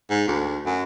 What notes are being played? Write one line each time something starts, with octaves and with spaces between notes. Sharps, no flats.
G#2
D2
F#2